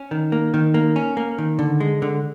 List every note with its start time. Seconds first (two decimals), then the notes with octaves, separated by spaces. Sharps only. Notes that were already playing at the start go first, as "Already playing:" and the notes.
Already playing: C#4
0.11 D#3
0.32 A#3
0.54 D#3
0.74 A#3
0.96 C#4
1.17 A#3
1.38 D#3
1.59 D3
1.80 G#3
2.02 D3